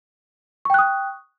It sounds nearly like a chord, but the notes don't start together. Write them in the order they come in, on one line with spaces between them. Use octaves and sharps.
C#6 G5 F#6 D#6